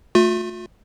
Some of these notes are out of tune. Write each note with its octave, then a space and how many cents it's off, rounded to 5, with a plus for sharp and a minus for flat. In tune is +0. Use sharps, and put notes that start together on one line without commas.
A3 +5 F4 +40